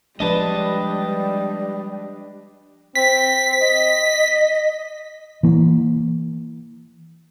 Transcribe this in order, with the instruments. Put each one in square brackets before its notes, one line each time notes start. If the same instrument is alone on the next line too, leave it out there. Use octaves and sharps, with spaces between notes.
[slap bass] F3 G#3 [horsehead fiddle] G3 [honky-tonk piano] D4 B4 [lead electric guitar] D#5 A5
[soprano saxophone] C4 [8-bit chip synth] B6
[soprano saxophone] D#5
[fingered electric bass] E3 A#3